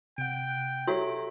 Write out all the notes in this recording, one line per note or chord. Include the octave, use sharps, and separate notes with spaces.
C3 F#5 G5 D7
F#6
F#4 G4 A4 C#5 E5 A#5